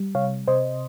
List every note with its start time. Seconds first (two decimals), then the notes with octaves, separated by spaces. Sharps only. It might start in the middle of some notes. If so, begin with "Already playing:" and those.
Already playing: G3
0.15 C3 C#5 F5
0.48 C3 C5 D#5